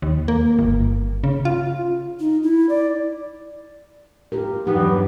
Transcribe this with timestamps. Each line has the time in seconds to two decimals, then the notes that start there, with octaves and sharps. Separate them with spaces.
0.02 D#2
0.28 A#3
0.59 G1
1.24 C#3
1.45 F4
2.20 D#4
2.43 E4
2.69 D5
4.32 F4 G4 A#4
4.67 E2 G2 F#3 B3 D#4 G4